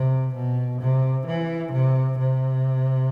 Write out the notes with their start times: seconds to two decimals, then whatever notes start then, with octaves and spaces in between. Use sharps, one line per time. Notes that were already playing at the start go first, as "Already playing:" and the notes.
Already playing: C3
0.34 B2
0.81 C3
1.27 E3
1.72 C3
2.18 C3